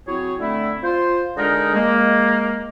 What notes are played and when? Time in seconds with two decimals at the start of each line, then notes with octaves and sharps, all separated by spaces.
0.07 F#3 C4 E4 G#4 C#5
0.40 D3 A3 C4 E4
0.83 F4 C5
1.37 D3 G#3 D4 D#4 G#4 A#4
1.74 G#3 A#3